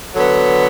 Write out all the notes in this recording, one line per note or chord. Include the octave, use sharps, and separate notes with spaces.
D3 F#3 B3